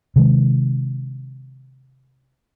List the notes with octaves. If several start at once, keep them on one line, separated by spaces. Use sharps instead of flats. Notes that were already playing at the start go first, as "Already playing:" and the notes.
C3 D#3 G#3